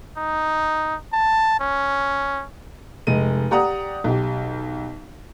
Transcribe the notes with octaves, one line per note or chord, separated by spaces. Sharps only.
D#4
A5
C#4
F1 G#3 D#7
G4 D5 F#5 A#5 D#6
B1 G4